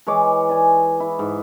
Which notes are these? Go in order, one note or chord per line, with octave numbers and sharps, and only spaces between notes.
E3 G#3 C#5 D6
D5 G#5
E4
G#2